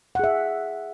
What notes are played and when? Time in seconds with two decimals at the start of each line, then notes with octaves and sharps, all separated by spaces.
0.15 F#5
0.19 G#4
0.24 E5